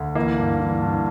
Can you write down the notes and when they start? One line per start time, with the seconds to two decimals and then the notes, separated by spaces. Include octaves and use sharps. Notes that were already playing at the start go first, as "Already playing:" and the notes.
Already playing: D2
0.15 E3 A#3
0.38 G2
0.60 E3
0.82 G2